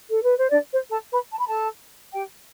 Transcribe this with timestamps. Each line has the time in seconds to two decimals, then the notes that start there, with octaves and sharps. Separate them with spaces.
0.09 A4
0.23 B4
0.37 C5
0.50 D4 D5
0.71 C5
0.90 A4 A5
1.11 B4 B5
1.31 A5
1.39 B5
1.47 A4 A5
2.13 G4 G5